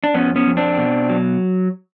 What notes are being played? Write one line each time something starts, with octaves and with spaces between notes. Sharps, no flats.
D4
F2 B3 C#4
B3 C#4
F2
C4 D4
B2
F#3